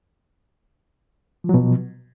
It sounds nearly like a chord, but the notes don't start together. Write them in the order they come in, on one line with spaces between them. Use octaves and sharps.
F3 F#3 B2